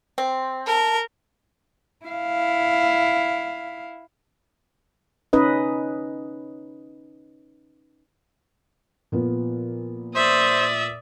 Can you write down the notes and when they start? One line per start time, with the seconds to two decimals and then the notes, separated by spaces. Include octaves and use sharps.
0.18 C4
0.67 A#4 A5
2.05 E4 F5
5.33 C#4 D#4 B4 D#5
9.12 A#2 F3 B3
10.15 C5 D5 E5 D#6